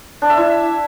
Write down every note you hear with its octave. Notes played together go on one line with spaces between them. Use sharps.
D4
E5
E4